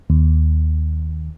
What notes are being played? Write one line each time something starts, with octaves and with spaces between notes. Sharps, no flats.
D#2